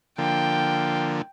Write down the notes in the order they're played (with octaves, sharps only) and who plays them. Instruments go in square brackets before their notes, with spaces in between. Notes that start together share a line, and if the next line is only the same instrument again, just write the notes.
[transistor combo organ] D3 F3 A#3 [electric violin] G5